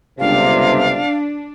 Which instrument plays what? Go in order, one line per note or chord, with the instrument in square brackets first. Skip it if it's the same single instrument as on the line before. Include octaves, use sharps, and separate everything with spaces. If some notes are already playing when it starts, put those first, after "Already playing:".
[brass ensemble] G1 C#2 C3 [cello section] D4 [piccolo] F5